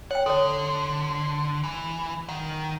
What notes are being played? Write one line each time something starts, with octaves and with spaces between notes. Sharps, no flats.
C#5 F#5 G5
D3 A4 C#5
E3
D#3 F#5